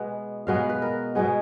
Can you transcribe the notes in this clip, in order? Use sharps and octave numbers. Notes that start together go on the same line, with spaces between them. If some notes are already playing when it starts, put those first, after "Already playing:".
Already playing: B2 G#3 B3
B2 G#3 B3 F5
B4
A#4
B2 G#3 B3 G#4